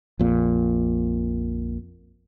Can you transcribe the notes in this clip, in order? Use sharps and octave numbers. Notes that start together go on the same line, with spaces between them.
A#1 F2 A#2